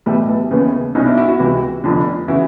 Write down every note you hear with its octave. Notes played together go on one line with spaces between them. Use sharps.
B1 A2 E3 G3 A3
A3 B3
D#2 C#3 E3 B3 C#4
C2 B2 C#4 D#4
D4 E4
E4 F#4
E4 F#4
C#2 C3 E3
F1 F2 D3
C#3 E3 E4 F#4